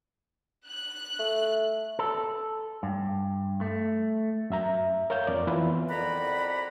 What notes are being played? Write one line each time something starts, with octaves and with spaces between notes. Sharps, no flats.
F#6
A3
A4
G2
A3
F#2 E5 A#5
A#4 C#5 F5 G6
F2 D5
E3 B3 F4 B4
C2 F2 D5 F#5 A#5 B5